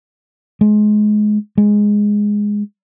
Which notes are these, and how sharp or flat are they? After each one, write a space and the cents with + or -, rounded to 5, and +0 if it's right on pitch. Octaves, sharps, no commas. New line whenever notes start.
G#3 +25
G#3 -5